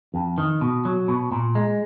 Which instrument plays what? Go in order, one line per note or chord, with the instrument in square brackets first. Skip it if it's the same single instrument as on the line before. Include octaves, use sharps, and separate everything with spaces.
[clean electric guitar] F2
D#3
B2
F#3
B2
A#2
G#3